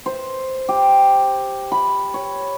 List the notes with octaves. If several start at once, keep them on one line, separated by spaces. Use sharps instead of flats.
C5
G4
B5
C#5